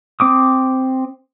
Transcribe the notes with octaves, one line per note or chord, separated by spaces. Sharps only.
C4 D6 D#6